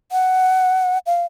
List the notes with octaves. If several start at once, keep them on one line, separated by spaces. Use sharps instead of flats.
F#5
F5